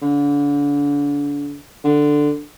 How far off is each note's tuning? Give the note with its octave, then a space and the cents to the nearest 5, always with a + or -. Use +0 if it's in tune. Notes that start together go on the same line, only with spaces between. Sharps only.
D3 -35
D3 +5